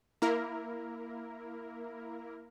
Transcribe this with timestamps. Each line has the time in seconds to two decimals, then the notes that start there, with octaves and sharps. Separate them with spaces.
0.22 A#3 E4 A#4